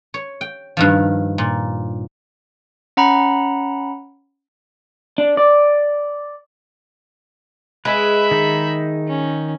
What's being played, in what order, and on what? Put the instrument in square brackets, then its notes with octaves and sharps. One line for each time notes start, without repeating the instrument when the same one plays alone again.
[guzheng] C#5
G5
G2 D#3 F3
A#2
[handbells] C#4 F#5 A#5 B5
[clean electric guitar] D4
D5
[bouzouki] G#3 [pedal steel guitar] B4 [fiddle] E5 B5
[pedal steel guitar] D#3 D#4
[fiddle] C#4